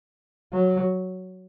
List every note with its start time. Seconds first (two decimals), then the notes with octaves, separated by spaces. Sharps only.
0.53 F#3